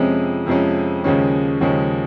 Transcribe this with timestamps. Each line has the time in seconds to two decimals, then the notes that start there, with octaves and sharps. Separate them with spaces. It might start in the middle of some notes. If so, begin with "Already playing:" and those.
Already playing: F2 C3 F3 G#3 C#4
0.46 F2 C3 F3 G#3 C#4
1.04 D#2 C#3 F3 G#3 C#4
1.61 D#2 C#3 F3 G#3 C#4